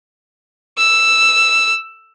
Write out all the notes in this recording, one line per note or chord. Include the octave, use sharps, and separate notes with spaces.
E6